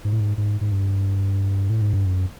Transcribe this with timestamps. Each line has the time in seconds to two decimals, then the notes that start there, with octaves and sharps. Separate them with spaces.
0.05 G#2
0.13 A2
0.20 G#2
0.38 G#2
0.61 G#2
0.72 G2
1.70 A2
1.81 G#2
1.93 G2
2.06 F#2